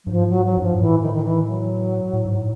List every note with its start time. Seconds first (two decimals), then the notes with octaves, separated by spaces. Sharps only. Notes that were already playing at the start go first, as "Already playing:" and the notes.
0.04 G2 F#3
0.11 G#2 F3
0.29 F#3
0.45 F#3
0.57 F#2
0.62 G2 F3
0.72 G#2
0.79 A2 E3
1.02 D#3
1.13 D#3
1.24 E3
1.47 F#3
2.13 A2
2.25 G#2
2.37 A2